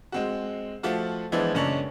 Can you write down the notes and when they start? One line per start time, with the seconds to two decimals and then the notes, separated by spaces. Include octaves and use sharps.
0.12 G#3 C4 F#4
0.83 F3 A3 F4 F#4
1.32 E3 F3 G#3 B3 D4 E4
1.54 F#2 A#2 C#3 G#3 C#4 D4